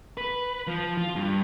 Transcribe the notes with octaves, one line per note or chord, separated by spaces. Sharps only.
B4
F3
F4
G2